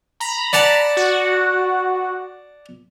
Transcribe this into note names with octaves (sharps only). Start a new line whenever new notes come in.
A#5 B5
D5 F#5 A5
F#4